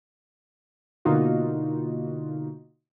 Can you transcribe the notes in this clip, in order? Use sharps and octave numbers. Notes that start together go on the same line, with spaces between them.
B2 D3 A#3 D#4 F4 F#4